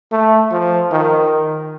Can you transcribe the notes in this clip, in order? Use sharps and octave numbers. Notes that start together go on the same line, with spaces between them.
A3
F3
D#3